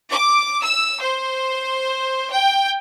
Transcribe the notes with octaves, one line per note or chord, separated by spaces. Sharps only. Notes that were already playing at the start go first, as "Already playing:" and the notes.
D6
E6
C5
G5